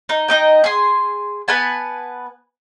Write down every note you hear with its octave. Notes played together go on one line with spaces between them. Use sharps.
D#4
D#4 D#5 G5
G#4 C6
B3 B4 G#5 A5